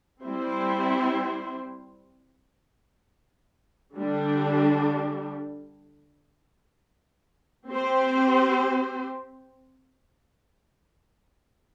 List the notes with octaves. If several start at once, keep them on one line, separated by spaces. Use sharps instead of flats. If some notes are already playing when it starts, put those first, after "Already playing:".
G3 C4 E4 C5
D3 G3 D4
C4 G4 C5